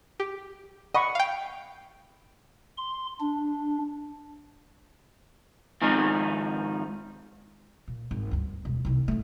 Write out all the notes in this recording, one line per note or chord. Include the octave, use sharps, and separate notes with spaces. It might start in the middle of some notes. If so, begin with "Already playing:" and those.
G4
D#5 F#5 B5 C#6
F5 G5
C6
D4
G#2 D#3 F3 D#4
A#2
G#1
D2 G2
E1
C2 D#3
G#1 A3